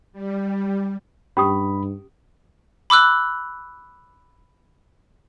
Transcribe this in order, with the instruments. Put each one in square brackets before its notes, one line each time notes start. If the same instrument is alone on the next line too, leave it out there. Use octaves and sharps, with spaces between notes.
[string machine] G3
[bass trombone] G2 [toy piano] C#4 G4 D#6 [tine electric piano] B5
[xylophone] B5 D6 E6 F#6